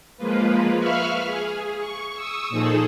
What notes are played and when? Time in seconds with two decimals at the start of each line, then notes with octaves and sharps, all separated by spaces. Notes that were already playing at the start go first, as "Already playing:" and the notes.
0.17 F3 G#3 A#3 F4 B4
0.78 B4 E5 F5 B5 C#6 F6
1.24 G#4
1.78 C#6
2.14 C#6 D#6 E6
2.49 A#2 F3 D#4 G#4 A4